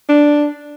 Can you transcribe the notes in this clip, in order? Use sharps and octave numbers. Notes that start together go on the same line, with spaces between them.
D4